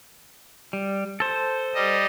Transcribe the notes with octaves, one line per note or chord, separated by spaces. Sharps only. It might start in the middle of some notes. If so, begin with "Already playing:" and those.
G3
A4 C5
G3 D#5